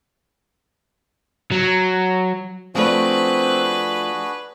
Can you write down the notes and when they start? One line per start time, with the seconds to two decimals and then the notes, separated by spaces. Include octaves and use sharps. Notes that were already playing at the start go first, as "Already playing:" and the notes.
1.52 F#3
2.75 F3 A3 C4 D4 F#4 G#4 B4 D5